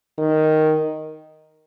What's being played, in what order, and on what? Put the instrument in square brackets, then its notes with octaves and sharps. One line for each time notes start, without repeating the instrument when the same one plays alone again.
[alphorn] D#3